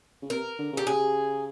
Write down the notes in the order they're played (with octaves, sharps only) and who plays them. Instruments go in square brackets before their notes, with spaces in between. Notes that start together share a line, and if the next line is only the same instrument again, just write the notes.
[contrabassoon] C#3
[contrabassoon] C3 [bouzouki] A#4
[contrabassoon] D3
[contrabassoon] C#3 [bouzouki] G4
[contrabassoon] C#3 [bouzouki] G#4